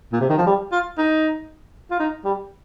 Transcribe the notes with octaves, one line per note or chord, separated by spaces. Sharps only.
A#2
C3
D#3
F3
G3
F4
D#4
F4
D#4
G3